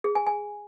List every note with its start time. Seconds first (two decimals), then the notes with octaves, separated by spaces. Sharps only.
0.04 G#4
0.15 G#5
0.27 G#5